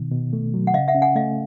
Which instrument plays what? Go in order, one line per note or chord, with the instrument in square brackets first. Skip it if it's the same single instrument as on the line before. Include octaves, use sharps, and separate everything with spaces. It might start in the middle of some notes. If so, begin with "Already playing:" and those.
Already playing: [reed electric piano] B2 D#3
B2
A3
F#3
[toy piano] F#5
[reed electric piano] C#3 [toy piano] D#5 F5
[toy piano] E5 F#5
[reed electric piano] C#4
[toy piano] F#5 G#5
[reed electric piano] A3 [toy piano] D#5 F5